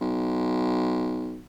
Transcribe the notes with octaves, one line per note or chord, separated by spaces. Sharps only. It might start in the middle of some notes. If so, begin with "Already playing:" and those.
B1